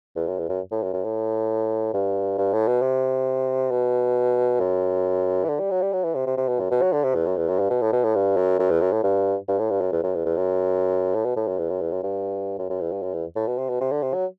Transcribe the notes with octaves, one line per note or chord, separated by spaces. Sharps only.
E2
F#2
E2
F#2
A2
F#2
F#2
A2
G2
G2
A2
B2
C3
B2
F#2
E3
D3
G3
F#3
G3
F#3
E3
C3
C3
C3
B2
F#2
B2
F#3
D3
C3
E2
F#2
E2
F#2
G2
B2
A2
B2
A2
G2
F#2
F#2
E2
F#2
A2
G2
G2
A2
G2
F#2
E2
F#2
E2
E2
F#2
A2
B2
A2
F#2
E2
F#2
E2
F#2
G2
F#2
F#2
E2
G2
F#2
E2
A2
B2
C3
B2
C3
D3
C3
F#3